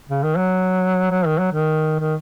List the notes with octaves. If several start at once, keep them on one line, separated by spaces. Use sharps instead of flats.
C#3
D#3
F#3
F#3
D#3
F#3
D#3
D#3